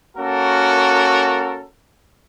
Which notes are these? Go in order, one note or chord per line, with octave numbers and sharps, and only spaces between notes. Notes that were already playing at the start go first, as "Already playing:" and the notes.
A#3 C#4 F#4 A4 A#4